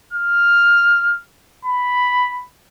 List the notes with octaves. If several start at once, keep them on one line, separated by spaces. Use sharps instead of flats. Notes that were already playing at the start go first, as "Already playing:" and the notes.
F6
B5